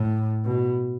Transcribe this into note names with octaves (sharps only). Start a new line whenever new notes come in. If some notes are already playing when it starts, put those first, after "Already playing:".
Already playing: A2
B2